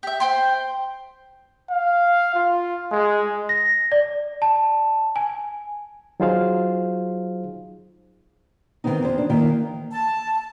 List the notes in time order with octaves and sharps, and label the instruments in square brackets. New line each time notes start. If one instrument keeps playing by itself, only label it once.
[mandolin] G4 E5
C5 G5 C6
[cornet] F5
F4
G#3
[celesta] A#6
D5
A5
G#5
[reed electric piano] F#3 D#4 F4 G#4 C5 F5
[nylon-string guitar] D#3 E3 F#3 B3 C4 D#4
E2 C5
D4
D#3 E3 A#3 E4
[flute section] A5